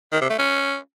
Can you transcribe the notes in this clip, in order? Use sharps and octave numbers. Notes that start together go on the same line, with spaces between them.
D#3
C3
A3
C#4